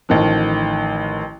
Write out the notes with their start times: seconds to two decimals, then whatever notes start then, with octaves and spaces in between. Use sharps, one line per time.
0.09 A1 D#3 F3